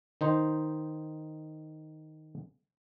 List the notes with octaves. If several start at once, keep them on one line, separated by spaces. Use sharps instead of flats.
D#3 D#4 C5